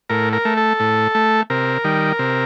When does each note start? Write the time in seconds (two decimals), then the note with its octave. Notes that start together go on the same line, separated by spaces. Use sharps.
0.10 A2 A#4
0.33 A#4
0.45 A3
0.57 A4
0.80 A2
1.15 A3
1.50 C3 A#4
1.84 D#3 G3
2.19 C3